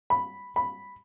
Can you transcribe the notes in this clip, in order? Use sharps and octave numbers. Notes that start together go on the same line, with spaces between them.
B5
B5